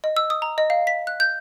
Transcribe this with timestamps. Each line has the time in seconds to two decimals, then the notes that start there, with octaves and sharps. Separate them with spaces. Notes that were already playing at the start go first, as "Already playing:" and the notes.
0.04 D#5
0.17 E6
0.30 D#6
0.42 A#5
0.58 D#5
0.70 F5
0.87 B6
1.07 F#6
1.20 G6